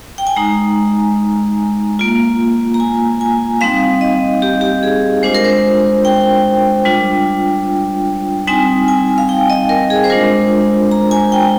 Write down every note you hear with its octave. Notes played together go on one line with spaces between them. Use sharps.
G5
G#5
G#3 D#4 A#5
A#3 F4
A#5
G#5
G#5
G3 C4 D#4 F5
D#5
G4
G4
G#4
G#3 D4 F4 C5
A#4
C5
G5
G3 D4 F4
G3 C4 D#4 G#5
G#5
F5
G5
D#5
A#4
G#4
C5
G#3 D4 F4 A#4
A#5
G#5
G5